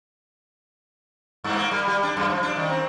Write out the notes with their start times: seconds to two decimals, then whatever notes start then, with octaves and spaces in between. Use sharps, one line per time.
1.44 G2
1.57 A#3
1.71 G3
1.88 G3
2.03 D4
2.17 F#2
2.30 F3
2.43 D4
2.56 D#3
2.70 C4